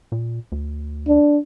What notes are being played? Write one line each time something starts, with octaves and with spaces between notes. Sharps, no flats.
A#2
D2
D4